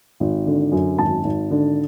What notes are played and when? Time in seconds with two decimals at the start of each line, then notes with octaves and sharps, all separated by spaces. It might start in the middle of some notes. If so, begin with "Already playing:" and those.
0.20 G#1
0.47 D3
0.72 F#2
0.98 G#1 A5
1.24 G#1
1.51 D3